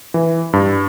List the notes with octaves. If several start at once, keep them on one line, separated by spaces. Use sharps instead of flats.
E3
G2